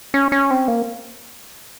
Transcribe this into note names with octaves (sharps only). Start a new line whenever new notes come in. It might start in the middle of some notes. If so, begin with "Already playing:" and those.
C#4
C#4
C4
A#3